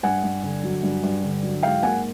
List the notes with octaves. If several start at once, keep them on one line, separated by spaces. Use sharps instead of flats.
G2 F#5 G#5
G2
D3
F#3
G2
G2
D3
F#3
G#2 F5 G5
A#3 F#5 G#5